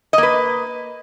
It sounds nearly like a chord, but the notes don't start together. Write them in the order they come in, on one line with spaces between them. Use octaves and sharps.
D#5 A#3 B4